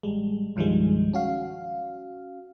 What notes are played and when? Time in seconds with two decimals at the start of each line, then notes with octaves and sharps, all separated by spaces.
0.03 A1 G3 G#3
0.56 C2 G2 D#3 F3 G3 G#3
1.13 C#4 F#4 F5